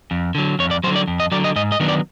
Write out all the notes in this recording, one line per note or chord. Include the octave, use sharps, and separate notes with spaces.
F2
D3 F#3
F2 C#5
D5
D3 F#3 C5
D5
F2
D#5
D3 F#3 D5
D#5
G#2 D#5
D#5
D#3 F#3 B3 D4
D5